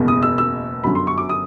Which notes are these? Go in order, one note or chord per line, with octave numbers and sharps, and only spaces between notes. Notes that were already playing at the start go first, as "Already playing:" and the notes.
Already playing: F#1 E2 B2 G#3
D#6
E6
E6
G1 F#2 D3 F#3 B5
C6
C#6
D6
D#6